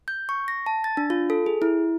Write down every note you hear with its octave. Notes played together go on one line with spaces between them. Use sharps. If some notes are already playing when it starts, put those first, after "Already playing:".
G6
C#6
A#6
A5
A6
D4
F4
A4
G#4
E4